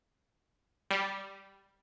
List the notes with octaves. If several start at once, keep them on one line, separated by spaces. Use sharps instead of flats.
G3